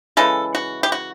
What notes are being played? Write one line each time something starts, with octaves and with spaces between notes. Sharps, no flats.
C#3 E3 G#3 A4
F#4
G4
F#4